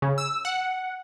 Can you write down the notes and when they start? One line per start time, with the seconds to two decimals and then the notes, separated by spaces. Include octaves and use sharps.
0.02 C#3
0.18 E6
0.45 F#5